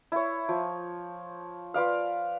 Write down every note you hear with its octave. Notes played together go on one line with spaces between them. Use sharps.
E4 C#5
F3
F4 B4 D5 F5